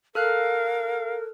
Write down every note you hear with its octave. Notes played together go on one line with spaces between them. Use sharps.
A4 A#4 F5 F6 F#6